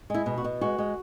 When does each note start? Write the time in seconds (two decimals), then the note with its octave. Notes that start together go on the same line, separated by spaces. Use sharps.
0.10 G#3 E4
0.26 B2
0.38 F#4
0.44 B2
0.61 G#3 F#4
0.78 G#3